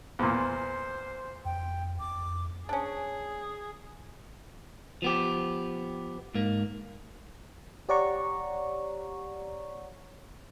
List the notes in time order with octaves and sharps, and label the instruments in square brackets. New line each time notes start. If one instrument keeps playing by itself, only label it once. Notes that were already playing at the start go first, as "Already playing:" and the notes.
[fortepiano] E2 A#2 [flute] C5
[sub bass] F2 [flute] G5
[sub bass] F2 [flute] D6
[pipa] C#4 D4 [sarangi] G#4
[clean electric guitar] F3 B3 G4
G#2 A#3
[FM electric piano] G4 C#5 D5 F#5 A#5 C#6